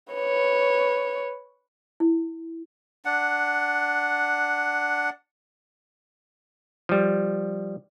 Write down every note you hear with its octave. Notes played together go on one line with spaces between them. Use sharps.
B4 C#5
E4
D4 F#5
F3 G3